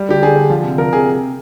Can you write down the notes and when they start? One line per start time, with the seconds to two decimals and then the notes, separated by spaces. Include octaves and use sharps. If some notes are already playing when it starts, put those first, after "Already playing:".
Already playing: G3
0.09 D3 G4
0.22 D3 G#4
0.36 D3
0.50 F3
0.64 C3
0.78 F3 A#4
0.93 C3 G#4